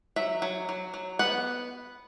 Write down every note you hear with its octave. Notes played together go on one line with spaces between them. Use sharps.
F#3 E5
F#3
F#3
F#3
B3 F#5